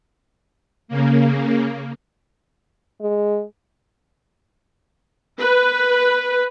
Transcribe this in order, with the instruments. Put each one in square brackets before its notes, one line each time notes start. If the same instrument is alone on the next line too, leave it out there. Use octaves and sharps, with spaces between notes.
[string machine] C#3 A#3
[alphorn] G#3
[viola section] B4